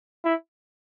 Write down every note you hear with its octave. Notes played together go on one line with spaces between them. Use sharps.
E4